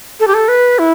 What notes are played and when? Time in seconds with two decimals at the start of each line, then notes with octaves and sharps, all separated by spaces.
0.20 A4
0.28 G4
0.34 A4
0.48 B4
0.79 E4